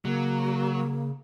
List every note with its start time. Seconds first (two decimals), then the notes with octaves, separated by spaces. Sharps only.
0.05 C#3 F#3 A#3